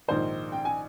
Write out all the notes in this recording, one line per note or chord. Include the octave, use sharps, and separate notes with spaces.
A#1 G#2 D#3 C5
G5
G#5